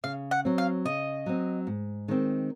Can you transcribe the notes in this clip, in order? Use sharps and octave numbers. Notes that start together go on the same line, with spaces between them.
C#3 F5
F#5
F#3 C4
F5
C#3 D#5
F#3 C4
G#2
D#3 G#3 C4